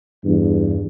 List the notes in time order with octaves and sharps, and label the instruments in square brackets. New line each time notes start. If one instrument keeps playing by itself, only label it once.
[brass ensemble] E2 G2